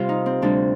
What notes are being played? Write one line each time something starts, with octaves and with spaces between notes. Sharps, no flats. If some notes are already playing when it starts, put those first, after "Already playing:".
Already playing: C3 G3 F4
D#4
C4
D2 C3 G3 D4